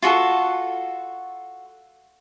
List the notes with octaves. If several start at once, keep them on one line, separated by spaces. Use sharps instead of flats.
F4 F#4 G#4 A4